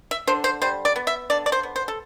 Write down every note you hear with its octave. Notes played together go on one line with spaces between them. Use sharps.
E5
D3 C5
C5
G3 C5
D5
B3
E5
D3 D5
D5
C5
B3
C5
A4